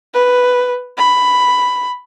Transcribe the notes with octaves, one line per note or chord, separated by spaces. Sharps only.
B4
B5